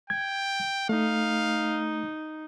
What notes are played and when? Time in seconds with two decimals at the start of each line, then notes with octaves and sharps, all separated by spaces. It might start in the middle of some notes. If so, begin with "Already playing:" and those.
0.10 G5 G#6
0.89 A3 D#4 F5